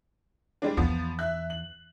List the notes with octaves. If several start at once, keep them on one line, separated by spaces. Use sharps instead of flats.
G3 G#3 D4
E2 F3 B3
E5 F#6
F#7